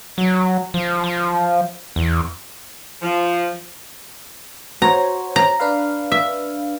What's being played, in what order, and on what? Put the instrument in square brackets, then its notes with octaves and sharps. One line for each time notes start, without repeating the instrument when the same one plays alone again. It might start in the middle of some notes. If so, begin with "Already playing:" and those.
[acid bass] F#3
F3
F3
E2
[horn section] F3
[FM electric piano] F#4 C5 C#5 [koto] A#5
[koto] A#5
[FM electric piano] D4 B4 F5
[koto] E5